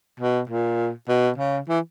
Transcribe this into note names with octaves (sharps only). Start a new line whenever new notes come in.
B2
A#2
B2
C#3
E3